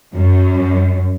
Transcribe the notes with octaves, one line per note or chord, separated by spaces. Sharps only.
F#2